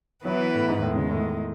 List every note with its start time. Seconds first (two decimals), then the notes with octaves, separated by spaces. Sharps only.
0.25 E3 F#3 B3 E4 B4
0.54 A2
0.68 G#2
0.82 E2 A2 D#3 G#3
0.96 C#3
1.11 A2